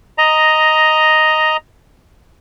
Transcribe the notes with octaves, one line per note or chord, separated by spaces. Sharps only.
D#5 A#5